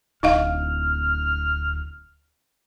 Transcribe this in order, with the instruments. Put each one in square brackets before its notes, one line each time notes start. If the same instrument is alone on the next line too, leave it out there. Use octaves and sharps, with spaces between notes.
[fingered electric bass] D1 [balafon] D#4 D#5 F5 [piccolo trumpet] F6